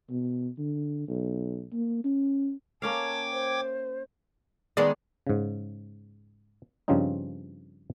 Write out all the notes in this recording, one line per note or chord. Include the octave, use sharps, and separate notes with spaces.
B2
D3
B1
A#3
C#4
A#3 C#4 F5 G5 A5 D6 G#6
C5
D#3 G#3 B3 D5
G#2 C#3
G2 C#3 F3 C4 C#4 D#4